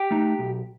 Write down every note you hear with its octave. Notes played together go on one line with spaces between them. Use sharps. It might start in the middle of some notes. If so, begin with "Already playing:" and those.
Already playing: G4 G5
A3 D#4
B1